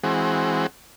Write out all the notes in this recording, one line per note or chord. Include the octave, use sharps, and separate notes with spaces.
E3 G#3 C4 F#4